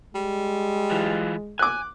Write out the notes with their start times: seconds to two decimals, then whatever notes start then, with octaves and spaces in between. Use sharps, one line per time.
0.15 G3 G#3
0.92 E3 F4
1.59 G#5 D6 F#6